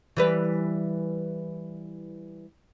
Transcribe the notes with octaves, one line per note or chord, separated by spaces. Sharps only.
E3 G3 B4